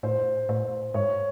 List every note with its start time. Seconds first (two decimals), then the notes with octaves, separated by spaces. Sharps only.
0.03 A2 C5
0.49 A2
0.94 G#2 C#5